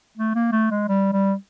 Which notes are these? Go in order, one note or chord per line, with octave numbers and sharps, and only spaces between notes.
A3
A#3
A3
G#3
G3
G3